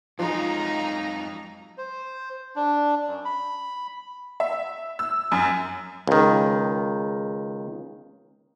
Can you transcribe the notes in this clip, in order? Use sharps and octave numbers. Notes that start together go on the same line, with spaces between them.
F2 F3 F#3 G#3 D#4 F4 A#5
C5
D4
F#2
B5
E5
E6
F#2
C#2 D#3